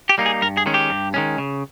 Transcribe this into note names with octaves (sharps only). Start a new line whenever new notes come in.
G4
G3 A#3 D#4
G#4
G2 A#4
G#4
D#3 G#3 C#4
G4
G2
D#3 G#3 C#4
C#3